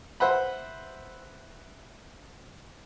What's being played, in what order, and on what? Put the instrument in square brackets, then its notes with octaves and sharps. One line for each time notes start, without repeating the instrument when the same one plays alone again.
[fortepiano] B4 C5 E5 F#5 B5